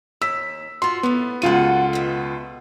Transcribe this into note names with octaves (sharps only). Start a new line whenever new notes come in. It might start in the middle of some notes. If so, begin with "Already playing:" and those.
D#2 E6 B6
F4 F#4 C6
A2 A3 B3
C#2 F4 F#4 A4 F#5 D#7
B2 E5